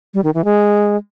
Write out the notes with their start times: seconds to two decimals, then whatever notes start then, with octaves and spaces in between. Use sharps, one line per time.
0.14 G3
0.24 D#3
0.34 E3
0.45 G#3